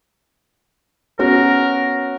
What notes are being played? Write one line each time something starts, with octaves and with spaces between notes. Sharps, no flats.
B3 C#4 F#4 A#4